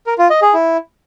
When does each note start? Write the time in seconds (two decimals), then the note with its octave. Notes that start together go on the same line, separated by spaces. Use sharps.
0.07 A#4
0.18 F4
0.30 D#5
0.42 G#4
0.54 E4